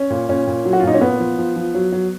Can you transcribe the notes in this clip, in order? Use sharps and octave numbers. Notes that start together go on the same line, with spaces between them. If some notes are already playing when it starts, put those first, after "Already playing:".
Already playing: C#4
A#2
A#2 C#4
A#2
F#3
F#4
F4
A#2 D#4
C#4
A#2 B3
F3
F3
F3
F#3
F#3